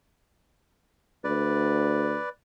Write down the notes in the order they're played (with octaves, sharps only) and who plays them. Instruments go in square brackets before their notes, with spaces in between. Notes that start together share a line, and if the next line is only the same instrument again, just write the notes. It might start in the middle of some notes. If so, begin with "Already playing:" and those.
[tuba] D2 [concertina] B4 D5